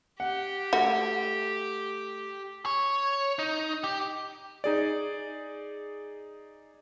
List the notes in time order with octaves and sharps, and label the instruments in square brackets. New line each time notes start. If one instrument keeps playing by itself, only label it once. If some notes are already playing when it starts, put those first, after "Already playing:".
[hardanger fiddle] G4 [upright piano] F#5
[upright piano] A3 [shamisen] F#4
[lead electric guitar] C#5
D#4
G4
[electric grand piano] D#4 G#4 D5